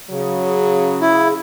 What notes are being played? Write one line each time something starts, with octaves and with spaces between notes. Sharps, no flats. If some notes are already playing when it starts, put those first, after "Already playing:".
C#3 F#3
E4